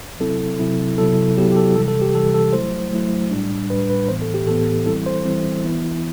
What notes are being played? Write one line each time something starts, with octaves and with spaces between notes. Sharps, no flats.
C3 F#3 C4 E4 A4
C3 F#3 C4 E4
C3 F#3 B3 E4 A4
C3 F#3 B3 E4 G4
G4
A4
C3 E3 G3 A4
A4
G4
C3 E3 G3 A4
A4
F#3 A3 E4 C5
F#3 A3 E4
A2 G3 D4
A2 G3 D4 B4
B4
A2 E3 B3 C5
A4
G4
A2 E3 B3 A4
E3 G3 C4 E4 A4
C5
E3 G3 C4 E4
E3 B3 E4